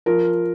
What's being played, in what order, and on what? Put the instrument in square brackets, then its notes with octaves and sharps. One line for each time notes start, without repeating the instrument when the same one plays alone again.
[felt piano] F3 A#4